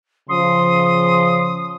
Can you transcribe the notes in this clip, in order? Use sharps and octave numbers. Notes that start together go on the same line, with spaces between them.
C#3 F3 C6 D#6